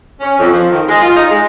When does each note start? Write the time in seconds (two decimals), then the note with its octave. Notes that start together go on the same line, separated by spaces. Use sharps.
0.21 C#4
0.39 F2
0.53 F3
0.70 D#3
0.88 G#3
1.02 F4
1.15 D#4
1.30 G#3